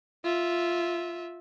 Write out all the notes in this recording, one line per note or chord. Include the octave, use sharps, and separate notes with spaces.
F4 E5